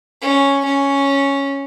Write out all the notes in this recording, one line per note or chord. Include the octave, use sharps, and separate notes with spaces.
C#4
C#4